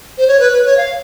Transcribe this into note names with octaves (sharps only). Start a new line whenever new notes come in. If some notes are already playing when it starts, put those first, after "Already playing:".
C5
C#5
B4
B4
C#5
F5